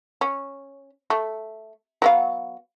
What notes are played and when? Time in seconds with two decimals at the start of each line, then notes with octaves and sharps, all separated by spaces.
0.21 C#4
1.10 A3
2.02 F#3 B3 F5